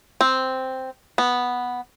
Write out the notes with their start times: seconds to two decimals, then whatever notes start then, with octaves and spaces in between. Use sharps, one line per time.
0.21 C4
1.18 B3